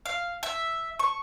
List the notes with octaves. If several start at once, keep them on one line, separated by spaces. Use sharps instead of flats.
F5
E5
C#6